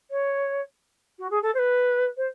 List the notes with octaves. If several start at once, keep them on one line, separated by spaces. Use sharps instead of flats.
C#5
F#4
G#4
A4
C5
B4
C5